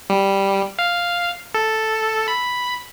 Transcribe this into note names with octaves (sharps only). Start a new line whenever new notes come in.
G3
F5
A4
B5